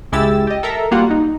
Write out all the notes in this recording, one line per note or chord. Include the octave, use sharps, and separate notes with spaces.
C#2 G#3 E4 G4 E6 A6
G4 D#5
A4 A#4 E5 A#5
G3 A#3 F4 F#4 F#5
D#4